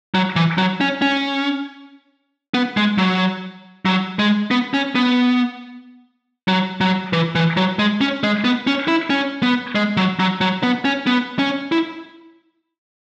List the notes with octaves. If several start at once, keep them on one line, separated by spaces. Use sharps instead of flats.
F#3
E3
F#3
C#4
C#4
B3
G#3
F#3
F#3
G#3
B3
C#4
B3
F#3
F#3
E3
E3
F#3
G#3
C#4
G#3
B3
C#4
E4
C#4
B3
G#3
F#3
F#3
F#3
B3
C#4
B3
C#4
E4